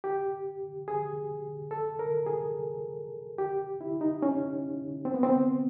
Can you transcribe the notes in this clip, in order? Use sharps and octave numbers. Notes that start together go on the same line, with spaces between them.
G4
G#4
A4
A#4
G#4
G4
E4
D#4
C#4
C4
B3
C4